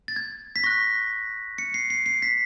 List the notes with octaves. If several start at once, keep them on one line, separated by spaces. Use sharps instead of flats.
A6
G#6
B6
C#6 F#6 A#6
C#7
C7
C7
C7
B6